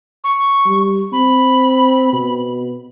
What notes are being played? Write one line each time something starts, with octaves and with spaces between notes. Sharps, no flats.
C#6
G3
C4 B5
B2